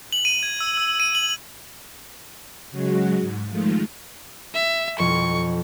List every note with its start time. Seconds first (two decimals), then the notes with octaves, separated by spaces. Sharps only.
0.13 F#7
0.25 D#7
0.43 G#6
0.60 E6
0.77 E6
1.00 D#7
1.15 F#7
2.71 C#3 F#3 G#3 F#4
3.20 G#2
3.49 D#3 F3 G#3 A3 F4
4.54 E5
4.99 B1 F2 C#6